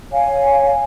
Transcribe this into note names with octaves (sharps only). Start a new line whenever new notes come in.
C#5 F5 G#5